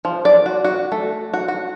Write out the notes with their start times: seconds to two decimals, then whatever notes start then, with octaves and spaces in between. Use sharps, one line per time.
0.05 F3
0.25 D5
0.46 F#4
0.64 F#4
0.92 A3
1.33 F#4
1.48 F#4